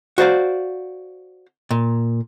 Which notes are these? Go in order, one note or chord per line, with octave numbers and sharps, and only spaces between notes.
F#4 C5 D5 F5
A#2